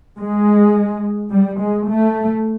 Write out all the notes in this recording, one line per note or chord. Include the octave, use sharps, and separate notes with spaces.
G#3
G3
G#3
A3